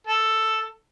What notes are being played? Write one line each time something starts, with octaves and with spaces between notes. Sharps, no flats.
A4